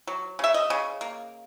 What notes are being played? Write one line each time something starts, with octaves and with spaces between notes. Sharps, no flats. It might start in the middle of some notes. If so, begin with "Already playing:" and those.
F#3
C#3 E5
D#5
C#3
A#3